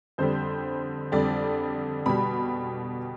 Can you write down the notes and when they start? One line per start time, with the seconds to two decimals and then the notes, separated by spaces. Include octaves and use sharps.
0.18 F2 D3 G3 C5
1.12 F2 D3 G3 D5
2.06 B2 G3 B5